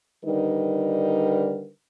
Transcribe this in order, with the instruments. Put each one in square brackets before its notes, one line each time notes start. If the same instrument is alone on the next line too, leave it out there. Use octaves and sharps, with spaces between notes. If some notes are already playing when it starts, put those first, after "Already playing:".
[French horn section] D3 D#3 G3 D#4 A#4 B4